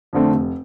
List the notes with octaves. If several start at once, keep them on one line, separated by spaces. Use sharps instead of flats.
F2 D3 A3 C4
F1